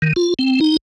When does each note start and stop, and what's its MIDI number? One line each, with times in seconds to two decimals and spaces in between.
0.02 0.13 51
0.16 0.34 65
0.39 0.60 60
0.61 0.77 63